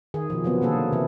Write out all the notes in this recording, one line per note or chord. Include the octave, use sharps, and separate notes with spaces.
D#3 G#4
B2 F3
C3 F#3 B3
B2 D3 D#3 A#3 G#4 A4
C3 E3 E4